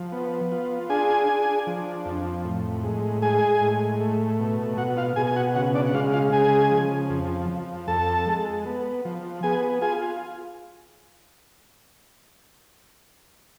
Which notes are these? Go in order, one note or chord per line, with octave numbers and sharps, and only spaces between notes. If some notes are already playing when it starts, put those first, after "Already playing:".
Already playing: F3
B3
F4
D4 G#4 G#5
D4
F3
F2
A2
G#3
G#3 G#4 G#5
A2
A3
B2
B2 F#4 F#5
F4 F5
B2 G#4 G#5
G#5
F#4 F#5
C#3 F#4 F#5
D4 D5
F#5
G#3 F4 F5
F4 F5
C#3 G#4 G#5
F3
F2
F3
F2 A4 A5
G#3
B3
F3
B3 G#4 G#5
F4 G#4 G#5